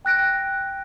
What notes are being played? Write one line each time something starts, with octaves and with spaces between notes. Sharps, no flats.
G5 F#6 A#6 D7